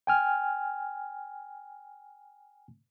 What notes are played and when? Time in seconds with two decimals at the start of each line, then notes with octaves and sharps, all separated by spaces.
0.07 G5 G#5 F6